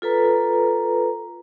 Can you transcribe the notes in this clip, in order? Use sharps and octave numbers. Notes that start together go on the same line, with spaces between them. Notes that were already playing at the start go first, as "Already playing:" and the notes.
F4 A4 B4 A#5